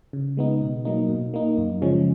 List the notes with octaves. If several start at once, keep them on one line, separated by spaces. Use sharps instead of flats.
C#3
G#3 B3 D#4
B2
F#3 A#3 D#4
B2
A#3 D#4
F#2
C#3 F3 G#3 C#4